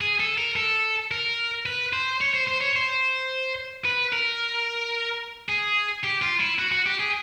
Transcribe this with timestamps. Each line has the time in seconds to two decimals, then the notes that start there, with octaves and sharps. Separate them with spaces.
0.01 G#4
0.20 A4
0.38 A#4
0.56 A4
1.11 A#4
1.66 B4
1.93 C5
2.21 C#5
2.34 C5
2.48 C5
2.62 C#5
2.76 C5
3.85 B4
4.13 A#4
5.49 G#4
6.04 G4
6.22 F4
6.40 E4
6.59 F#4
6.72 F#4
6.86 G4
7.00 G#4